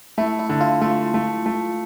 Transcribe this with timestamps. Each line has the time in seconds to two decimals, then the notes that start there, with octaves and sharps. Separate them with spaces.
0.18 A3 E4
0.39 E4
0.50 D3
0.61 F4
0.81 A3 F4
1.14 A3
1.46 A3